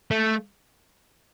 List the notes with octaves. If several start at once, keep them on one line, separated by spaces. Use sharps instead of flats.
A3